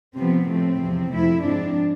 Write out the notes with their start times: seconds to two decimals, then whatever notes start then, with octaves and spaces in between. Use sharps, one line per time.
0.16 C3 F3 B3 C4
0.47 A2 F3 A3 C4
0.81 E2 C3 F3
1.12 F2 C3 F3 A3 E4
1.44 G#2 F3 G#3 C4 D4